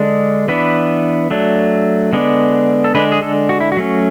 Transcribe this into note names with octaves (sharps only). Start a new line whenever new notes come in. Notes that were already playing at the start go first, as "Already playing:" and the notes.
Already playing: D3 G#3 D4
E3 B3 D4 B4
F#3 A3 D4
D3 G#3 B3 D4
A4
D3 G#3 D4 B4
G#4
A4
F#4
E4
F#4
F#3 A3 C#4